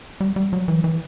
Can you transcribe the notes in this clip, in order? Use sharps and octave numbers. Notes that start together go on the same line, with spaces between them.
G3
G3
F#3
E3
E3